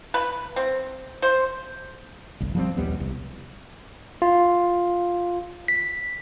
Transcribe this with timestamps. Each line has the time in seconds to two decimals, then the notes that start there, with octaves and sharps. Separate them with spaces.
0.14 B4
0.56 C4
1.22 C5
2.41 G1 C2
2.55 F3 G3 A3 C4
2.77 A#1 D#2 G3 B3
3.00 C2
4.22 F4
5.68 B6